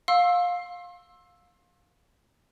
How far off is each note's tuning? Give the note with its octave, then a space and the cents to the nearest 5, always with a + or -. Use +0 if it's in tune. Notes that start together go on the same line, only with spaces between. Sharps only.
F5 +20 C6 +35 E6 +0